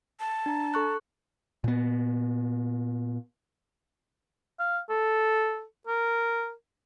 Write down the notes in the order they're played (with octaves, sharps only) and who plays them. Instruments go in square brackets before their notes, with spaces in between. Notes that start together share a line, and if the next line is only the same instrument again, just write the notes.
[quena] A5
[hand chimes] D4 A#5
A4 C#6 F#6
[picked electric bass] A#2 B3
[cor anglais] F5
A4
A#4